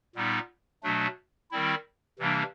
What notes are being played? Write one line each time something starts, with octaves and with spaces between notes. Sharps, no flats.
A#2 G3 B3 D#4
B2 F#3 A3 D4
D#3 G3 C4 E4
C3 E3 G3 A#3 D4